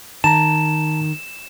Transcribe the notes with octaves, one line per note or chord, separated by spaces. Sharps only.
D#3 A5 A#5 E7